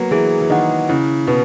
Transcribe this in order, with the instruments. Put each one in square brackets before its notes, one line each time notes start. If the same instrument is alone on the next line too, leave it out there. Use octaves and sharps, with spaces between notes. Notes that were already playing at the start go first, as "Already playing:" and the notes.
Already playing: [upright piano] F#3 A#3 B3
[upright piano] E3 [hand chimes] G#4
[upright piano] E3
[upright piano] D#3 [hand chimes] D#5 F#5
[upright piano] C#3 [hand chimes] E4
[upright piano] B2 [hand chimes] B4